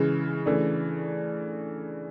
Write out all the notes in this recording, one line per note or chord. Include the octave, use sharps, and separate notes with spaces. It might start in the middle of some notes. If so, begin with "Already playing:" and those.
Already playing: C#3 E3 G#3
C#3 E3 A3 D4